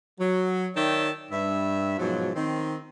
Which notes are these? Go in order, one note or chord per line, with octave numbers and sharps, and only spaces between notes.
F#3
D#3 C#5 D5 E5 G5 A5
G2 E5
G#2 B2 F3 F#3
D#3 C4